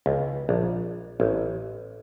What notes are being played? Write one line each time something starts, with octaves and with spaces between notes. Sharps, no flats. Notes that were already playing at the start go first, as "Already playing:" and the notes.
C#2
A#1
A1